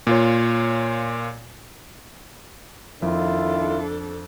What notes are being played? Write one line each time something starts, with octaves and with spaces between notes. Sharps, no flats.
A#2 F4 C#5
F2 D#3 D4 E4 F4 A4